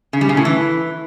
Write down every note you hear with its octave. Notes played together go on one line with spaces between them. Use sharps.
C#3
G3
C#3
A2
E3